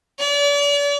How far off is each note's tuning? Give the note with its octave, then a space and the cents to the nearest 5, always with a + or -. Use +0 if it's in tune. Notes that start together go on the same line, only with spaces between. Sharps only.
D5 -40